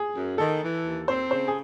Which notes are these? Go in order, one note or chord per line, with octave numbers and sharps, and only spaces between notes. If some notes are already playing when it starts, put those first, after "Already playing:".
Already playing: G#4
F#2
D#3 A4
E3
D#2
C4 C5
C#3 C5
G#4